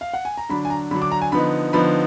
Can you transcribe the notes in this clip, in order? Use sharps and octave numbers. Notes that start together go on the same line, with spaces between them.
F5
F#5
G#5
A#5
D3 F#3 D4 B5
G#5
A#5
D3 F#3 D4 B5
D6
A#5
G#5
D3 F3 B3 D#4 B5
D3 F3 B3 D#4 B5